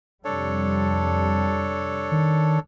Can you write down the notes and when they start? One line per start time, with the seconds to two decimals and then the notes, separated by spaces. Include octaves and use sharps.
0.25 F2 C3 G3 D4 A4 C#5
2.12 D#3